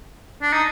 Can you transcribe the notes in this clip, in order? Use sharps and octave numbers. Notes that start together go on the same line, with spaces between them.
D4
D#4